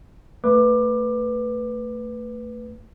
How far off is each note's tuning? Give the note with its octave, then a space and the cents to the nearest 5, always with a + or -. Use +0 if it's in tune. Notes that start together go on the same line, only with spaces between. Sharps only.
A3 +25 B4 +0 D6 +20